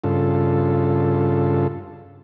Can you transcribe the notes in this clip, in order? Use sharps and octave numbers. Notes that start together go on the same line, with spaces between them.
G2 C#3 F4 A4